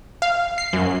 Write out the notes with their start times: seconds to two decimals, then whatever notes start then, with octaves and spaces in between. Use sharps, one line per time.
0.22 F5
0.58 C7
0.73 F#2